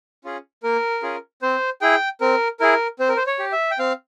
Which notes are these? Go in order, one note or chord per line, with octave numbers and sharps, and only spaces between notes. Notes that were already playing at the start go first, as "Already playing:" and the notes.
C#4 F4 G#4
A#3 A#4
C#4 F4 G#4
C4 C5
E4 G#4 G5
C4 A#4
E4 G#4 A#4
C4 C5
A#4
C5
C#5
G4
E5
G5
C4 F5